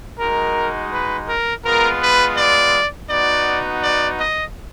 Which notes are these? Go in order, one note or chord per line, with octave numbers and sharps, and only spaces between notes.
G#3 D#4 F#4 A#4
B4
A#4
G#3 B3 F4 A#4
B4
D5
B3 D#4 F#4 D5
D5
D#5